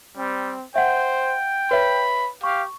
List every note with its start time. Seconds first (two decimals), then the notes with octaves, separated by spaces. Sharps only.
0.17 G3 C4
0.76 C5 E5 F#5 G5
1.71 B4 C#5 E5 B5
2.43 G4 F5 C#6